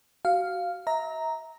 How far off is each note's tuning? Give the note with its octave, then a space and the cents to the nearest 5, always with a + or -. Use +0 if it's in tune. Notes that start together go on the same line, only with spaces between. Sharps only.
F#4 +25 F5 +0
E5 -35 A#5 +0